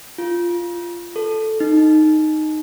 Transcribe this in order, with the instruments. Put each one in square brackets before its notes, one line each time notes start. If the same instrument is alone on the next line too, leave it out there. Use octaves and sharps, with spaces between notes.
[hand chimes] F4
A4
D#4